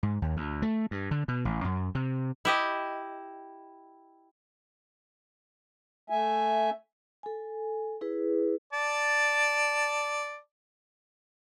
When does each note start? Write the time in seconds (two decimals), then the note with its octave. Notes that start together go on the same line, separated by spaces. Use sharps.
0.03 G#2
0.22 D#2
0.37 D2
0.62 A3
0.91 G2
1.11 D3
1.28 B2
1.45 A1
1.64 F#2
1.95 C3
2.45 E4 G4 D#5
6.10 A3 E5 G#5
7.23 A4 G#5
8.01 E4 G#4 B4
8.73 D5 A5